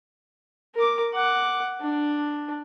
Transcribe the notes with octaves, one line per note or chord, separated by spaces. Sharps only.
A#4 D6
F#5 D6
D4